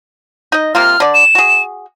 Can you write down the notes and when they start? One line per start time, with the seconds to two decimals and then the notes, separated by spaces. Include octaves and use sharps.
0.52 D#4 D#5
0.75 C3 A#3 F4 F6
1.00 D3 D5
1.14 E7
1.35 F#4 G#4